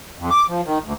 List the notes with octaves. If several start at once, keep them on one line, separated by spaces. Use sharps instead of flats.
F2
D6
F3
D#3
D2